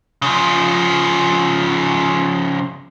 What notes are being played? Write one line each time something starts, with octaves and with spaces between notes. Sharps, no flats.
C#3 F3